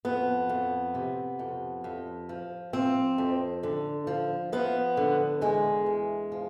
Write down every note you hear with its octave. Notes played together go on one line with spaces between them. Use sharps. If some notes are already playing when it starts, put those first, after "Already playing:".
F2 B3
F2
C3
F2
F2
F3
F3 C4
F2
D3
F3
F3 B3
D3
E2 G#3
E2
F3